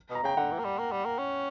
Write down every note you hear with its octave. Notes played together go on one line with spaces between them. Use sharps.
B2
A#5
C#3 G5
D3 F#5
E3
A#3
G3
A#3
G3
A#3
C#4